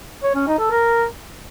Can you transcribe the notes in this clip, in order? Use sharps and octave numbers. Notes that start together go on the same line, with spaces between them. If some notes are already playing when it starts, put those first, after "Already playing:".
C#5
C#4
D#4
A4
A#4